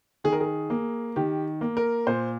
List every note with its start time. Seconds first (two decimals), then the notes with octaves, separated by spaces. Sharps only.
0.24 D#3 G#4
0.32 A#4
0.40 G#4
0.70 A#3
1.16 D#3 G4
1.61 A#3
1.77 A#4
2.07 A#2 C5